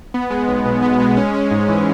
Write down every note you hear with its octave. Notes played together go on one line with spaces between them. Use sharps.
B3
G#3
B1
B2
B3
G#3
C#4
G#3
G#2
E3